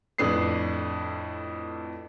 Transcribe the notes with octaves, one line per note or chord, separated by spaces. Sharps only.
F2 A2 D4 B4 D#6 C7